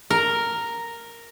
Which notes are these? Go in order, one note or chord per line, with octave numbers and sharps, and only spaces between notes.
A#4